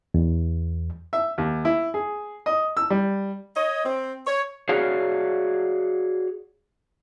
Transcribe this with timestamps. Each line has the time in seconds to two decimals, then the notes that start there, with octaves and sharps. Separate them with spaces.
0.14 E2
1.13 E5
1.38 D#2
1.65 E4
1.94 G#4
2.46 D#5
2.77 E6
2.90 G3
3.56 C#5 D#5
3.85 C4
4.27 C#5
4.69 F#4 G#4 C#5 D5 F5